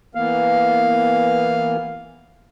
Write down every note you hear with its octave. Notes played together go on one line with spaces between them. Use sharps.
E3 A#3 B3 F5